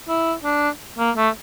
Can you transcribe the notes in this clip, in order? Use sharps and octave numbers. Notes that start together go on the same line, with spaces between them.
E4
D4
A#3
A3